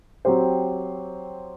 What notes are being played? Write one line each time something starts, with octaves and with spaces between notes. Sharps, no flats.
F#3 C4 G4 C5